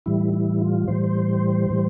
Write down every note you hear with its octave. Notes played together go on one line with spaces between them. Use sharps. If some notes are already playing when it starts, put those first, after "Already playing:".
A2 E3 G3 E4
E4
F4
A2 E3 G3 C5
A2 E3 G3